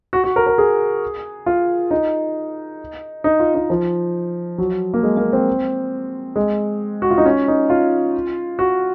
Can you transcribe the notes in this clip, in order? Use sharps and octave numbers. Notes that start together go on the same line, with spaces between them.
F#4
F#4
A#4
A#4
G#4
F4
D#4
D#4
F4
D#4
F3
F#3
A#3
G#3
A#3
C4
G#3
F#4
F4
D#4
C#4
D#4
F4
F#4